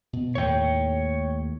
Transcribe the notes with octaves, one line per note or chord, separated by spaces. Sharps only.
B2
D#2 A2 A3 C#5 G5